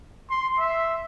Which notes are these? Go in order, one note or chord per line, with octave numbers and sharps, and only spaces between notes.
C6
E5